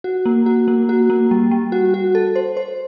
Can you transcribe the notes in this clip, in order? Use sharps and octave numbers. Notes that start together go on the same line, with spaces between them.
F#4
A#3
F#4
A#3
F#4
A#3
G3
G3
F#4
F#4
A4
C5
C5